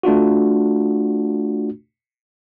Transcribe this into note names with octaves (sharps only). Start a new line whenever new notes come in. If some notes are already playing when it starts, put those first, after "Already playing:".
A3 D4 F4 F#4